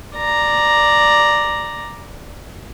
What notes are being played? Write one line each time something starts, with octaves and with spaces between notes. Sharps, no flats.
D5 A#5